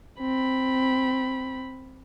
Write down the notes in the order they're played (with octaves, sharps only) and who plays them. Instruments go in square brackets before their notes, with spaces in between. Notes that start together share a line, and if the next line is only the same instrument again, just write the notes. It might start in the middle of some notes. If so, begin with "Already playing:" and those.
[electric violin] C4 B5